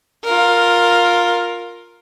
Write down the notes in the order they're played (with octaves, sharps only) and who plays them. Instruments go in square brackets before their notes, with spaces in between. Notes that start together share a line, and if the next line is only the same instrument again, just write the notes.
[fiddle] F4 A#4